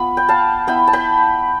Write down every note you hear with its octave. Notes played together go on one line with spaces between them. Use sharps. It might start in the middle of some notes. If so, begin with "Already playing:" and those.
Already playing: B3 F4 B5
G5
F5 A5
B3 E4 G5 B5
A5
G5 B5